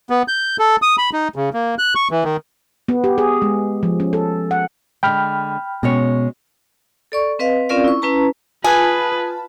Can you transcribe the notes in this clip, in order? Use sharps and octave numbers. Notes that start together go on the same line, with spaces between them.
B3
G6
A4
D#6
B5
D#4
C#3
A#3
F#6
C#6
E3
D#3
B3
G4
G#4
G#3
F3
C#4
A4
F#5
D3 G#3 G5 B5 F6
B2 G#3 C#4 C#5
A4 D5 C#6
C4 B4 D#5 F5
C4 C#4 F4 A#4 D5 F5
E4 C#6
C#4 E4 B4 A5 A#5
F4 G#4 B4 G#5 A5 B5